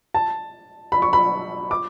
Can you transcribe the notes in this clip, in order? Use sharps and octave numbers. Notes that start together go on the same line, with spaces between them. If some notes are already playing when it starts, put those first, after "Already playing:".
A5
B5
C#6
B5
D6